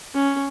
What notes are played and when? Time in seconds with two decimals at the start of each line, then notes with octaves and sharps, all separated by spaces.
0.14 C#4